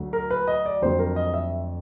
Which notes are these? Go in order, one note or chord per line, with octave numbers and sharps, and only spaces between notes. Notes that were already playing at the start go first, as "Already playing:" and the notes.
Already playing: D2 D3 F#3 A3
A#4
B4
D#5
D5
F2 D3 F#3 A3 C4 C5
A#4
D#5
E5